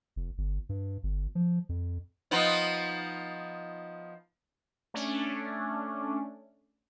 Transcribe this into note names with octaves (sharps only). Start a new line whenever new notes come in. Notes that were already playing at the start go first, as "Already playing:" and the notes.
F1
G1
G2
G1
F3
F2
F3 B3 D#4
A3 C#4 D4